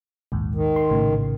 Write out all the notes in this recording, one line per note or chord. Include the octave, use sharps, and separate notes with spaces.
A#1 D#2 G#2
D#3
C6
A#1 A2 C#3